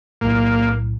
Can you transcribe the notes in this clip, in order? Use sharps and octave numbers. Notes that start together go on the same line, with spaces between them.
B1 A2 A#3